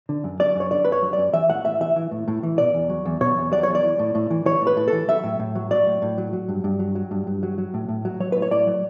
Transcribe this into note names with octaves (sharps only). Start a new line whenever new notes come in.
D3
F#2
F#3 D5
F#2 C#5
D3 D5
B4
F#2 C#5
F#3
F#2 D5
E3 E5
A2 F#5
A2 E5
E3 E5
E3
A2
A2
E3
B2 D5
E2
F#3
E2
B2 C#5
E2
F#3 D5
E2 C#5
D5
E3
A2
A2
E3
E3 C#5
A2
B4
A2
A4
E3
F#3 E5
A2
A2
F#3
F#3 D5
A2
A2
F#3
F#3
G2
G2
F#3
F#3
G2
G2
F#3
F#3
A2
A2
F#3
F#3 C#5
A2 B4
C#5
A2 D5
F#3